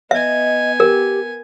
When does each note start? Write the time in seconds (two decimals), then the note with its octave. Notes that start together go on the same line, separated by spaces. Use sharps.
0.11 B3 D#5 E5 G#5
0.80 G4 A#4